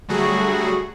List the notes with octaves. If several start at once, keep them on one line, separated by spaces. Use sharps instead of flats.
D3 F#3 G3 A3 F#4 G#4